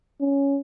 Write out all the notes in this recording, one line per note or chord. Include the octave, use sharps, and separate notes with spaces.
C#4